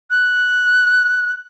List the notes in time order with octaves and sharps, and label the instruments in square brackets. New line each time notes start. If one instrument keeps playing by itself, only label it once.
[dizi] F#6